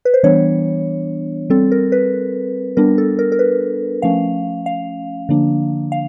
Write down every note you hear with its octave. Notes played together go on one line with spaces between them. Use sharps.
B4
C5
E3 G3 B3 D4 C#5
G3 C4 A4
A#4
B4
G3 B3 D4 A#4
A4
A#4
A#4
B4
F3 A3 C#4 F5
F5
D3 F3 A#3 D4
F5